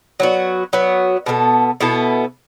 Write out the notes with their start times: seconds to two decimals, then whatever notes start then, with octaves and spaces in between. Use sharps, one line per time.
0.20 F#3 B3 F#4
0.73 F#3 B3 F#4
1.26 B2 B3 E4 A4
1.81 B2 B3 E4 A4